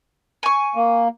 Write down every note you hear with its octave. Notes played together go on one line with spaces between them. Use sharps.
G#5 C#6
A#3